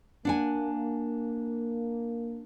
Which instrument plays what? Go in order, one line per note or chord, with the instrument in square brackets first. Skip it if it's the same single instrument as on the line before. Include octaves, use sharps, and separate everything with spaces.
[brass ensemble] A#3 [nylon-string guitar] D4 F#5 G#5